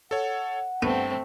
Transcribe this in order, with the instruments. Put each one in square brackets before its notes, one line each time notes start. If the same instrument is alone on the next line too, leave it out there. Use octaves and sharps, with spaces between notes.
[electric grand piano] A4 C#5 [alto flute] F#5
[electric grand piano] G2 [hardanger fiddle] A3 C4 [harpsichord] B3